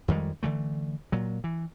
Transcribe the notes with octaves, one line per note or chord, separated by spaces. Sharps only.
F2 D#3 G3 G#3
D3 E3 A3
A#2 F#3
E3